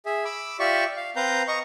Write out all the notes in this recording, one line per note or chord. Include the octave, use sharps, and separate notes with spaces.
G#4 E5
B5 D6 E6
F4 G4 D5 E5 C#6
F5
C4 B4 F5 A#5 G6
D#5 A#5 C#6